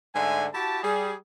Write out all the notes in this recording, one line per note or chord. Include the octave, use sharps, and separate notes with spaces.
G#2 D3 A3 D5 E5 G#5
E4 F#4 G4 A5
G3 G#4